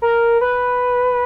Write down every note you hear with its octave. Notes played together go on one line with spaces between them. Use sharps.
A#4
B4